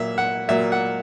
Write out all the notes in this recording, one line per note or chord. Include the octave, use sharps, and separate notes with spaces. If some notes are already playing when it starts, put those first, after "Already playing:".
Already playing: A#2 F#3 A#3 E5
F#5
A#2 F#3 A#3 E5
F#5